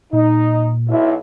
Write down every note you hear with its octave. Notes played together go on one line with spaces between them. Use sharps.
A#2 D#4
B1 E4